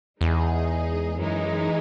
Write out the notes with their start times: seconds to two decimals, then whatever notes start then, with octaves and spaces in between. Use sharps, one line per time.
0.21 E2 G#3 D#4 G#4
1.17 F#2 E3 G#3 D#4